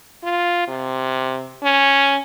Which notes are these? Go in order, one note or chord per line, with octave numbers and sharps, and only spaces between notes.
F4
C3
C#4